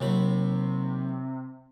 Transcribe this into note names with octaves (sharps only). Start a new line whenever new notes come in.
D#2 C3 F#3 B5